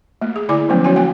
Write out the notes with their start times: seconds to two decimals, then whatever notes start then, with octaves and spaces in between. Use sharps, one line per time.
0.22 A3 A#3
0.36 G#4
0.49 D3 E4 D5 G#5 D6
0.69 F3 F#3 A3 B3 C#4
0.84 C#4 F#4 C#5 G#5
0.96 A#3 G5 G#5